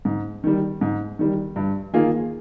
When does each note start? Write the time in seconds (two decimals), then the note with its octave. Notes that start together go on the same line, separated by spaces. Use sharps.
0.05 G#2
0.44 D#3 G3
0.81 G#2
1.19 D#3 G3
1.56 G2
1.93 D#3 A#3 F4 G#4